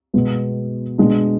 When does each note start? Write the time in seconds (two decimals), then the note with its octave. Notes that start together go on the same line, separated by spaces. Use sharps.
0.14 B2 G#3 B3
0.98 B2 G#3 D4